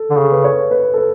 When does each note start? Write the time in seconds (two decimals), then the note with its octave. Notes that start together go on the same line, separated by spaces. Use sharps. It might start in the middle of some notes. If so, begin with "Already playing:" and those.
Already playing: A4
0.10 D3
0.16 C#3 A4
0.32 B4
0.44 C#5
0.71 B4
0.94 A4
0.98 B4